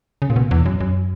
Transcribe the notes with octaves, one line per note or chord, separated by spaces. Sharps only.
C#3
A#2
B2
E2
F#2
F#2